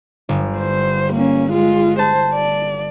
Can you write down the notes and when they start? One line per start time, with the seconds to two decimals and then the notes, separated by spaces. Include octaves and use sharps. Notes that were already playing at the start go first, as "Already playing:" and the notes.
0.29 G1
0.58 C5
1.13 A#3 C#4
1.51 G#3 F4
1.99 C5 A5
2.34 D5